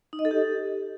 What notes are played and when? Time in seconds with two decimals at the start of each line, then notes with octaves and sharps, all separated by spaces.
0.13 D#4
0.19 D#5
0.25 A4
0.31 G4